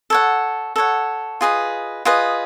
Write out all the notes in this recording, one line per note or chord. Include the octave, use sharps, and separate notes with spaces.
A4 C#5 F#5
A4 C#5 F#5
F4 G#4 B4 D#5
F4 G#4 B4 D#5